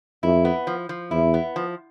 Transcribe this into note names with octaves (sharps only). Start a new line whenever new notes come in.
F2 E4
B3
F3
F3
E2 E4
B3
F3